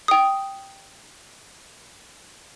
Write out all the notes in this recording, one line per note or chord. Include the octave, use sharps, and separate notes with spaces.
G5 D#6